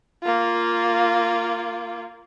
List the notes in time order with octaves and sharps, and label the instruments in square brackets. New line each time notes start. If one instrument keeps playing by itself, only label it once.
[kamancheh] A#3 F4